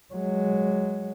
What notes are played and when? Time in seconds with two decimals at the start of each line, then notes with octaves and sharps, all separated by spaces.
0.14 F#3 G#3